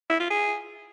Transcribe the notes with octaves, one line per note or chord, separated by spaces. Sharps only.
E4
F4
G#4